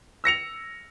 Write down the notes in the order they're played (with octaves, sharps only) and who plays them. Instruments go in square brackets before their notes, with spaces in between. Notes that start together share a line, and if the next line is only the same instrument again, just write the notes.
[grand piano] E6 A#6 C#7 F7